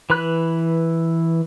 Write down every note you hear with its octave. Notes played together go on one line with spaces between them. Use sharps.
E3 B4 B5 F#6